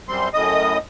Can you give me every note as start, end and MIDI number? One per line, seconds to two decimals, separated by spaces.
0.09 0.28 42
0.09 0.28 55
0.09 0.28 60
0.09 0.28 84
0.34 0.78 42
0.34 0.78 45
0.34 0.78 75
0.34 0.78 87